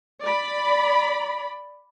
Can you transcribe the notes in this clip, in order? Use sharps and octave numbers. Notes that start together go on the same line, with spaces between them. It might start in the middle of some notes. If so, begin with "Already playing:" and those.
D5 B5